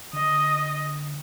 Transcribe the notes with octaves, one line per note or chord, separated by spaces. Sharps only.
D3 D#5